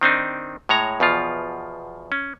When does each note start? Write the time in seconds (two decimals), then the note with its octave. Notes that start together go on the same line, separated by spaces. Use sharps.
0.01 D#3 C4 D4 D#4
0.69 A2 G#3 C#5 A#5
1.00 E2 B2 F3 F4
2.12 C#4